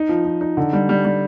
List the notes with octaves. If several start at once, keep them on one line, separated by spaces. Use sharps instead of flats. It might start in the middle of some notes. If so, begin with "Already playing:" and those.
Already playing: D#4
F3
F3
D#4
D3
G3
G3
G3